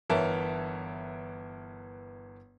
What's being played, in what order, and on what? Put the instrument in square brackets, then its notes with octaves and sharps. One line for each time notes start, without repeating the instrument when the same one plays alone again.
[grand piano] G1 E3 A#4 C#5 E5 A5